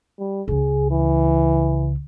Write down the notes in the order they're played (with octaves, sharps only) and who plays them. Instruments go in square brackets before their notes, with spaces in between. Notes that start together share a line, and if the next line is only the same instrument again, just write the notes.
[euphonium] G3
[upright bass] C#2 C#3 [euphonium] G#4
[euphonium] E3